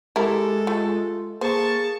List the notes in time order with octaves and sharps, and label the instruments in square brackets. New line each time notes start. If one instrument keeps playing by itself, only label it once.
[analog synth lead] G#3 [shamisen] E4 A#4 [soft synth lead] G4 [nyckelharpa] A4
[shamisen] A3 [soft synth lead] F4
[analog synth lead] A#3 [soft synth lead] G#4 [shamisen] C5 [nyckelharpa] A5 C#6